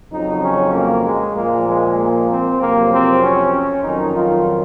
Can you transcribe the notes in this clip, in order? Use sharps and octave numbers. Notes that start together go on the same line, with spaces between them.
F2 C#3 F#3 D#4
C#4
A#3
G#3
A#2 F3 A#3
G#3
A#3
C4
F2 C3 F#3 A#3
C4
C#4
C#4
F2 D#3 F#3 D#4
F4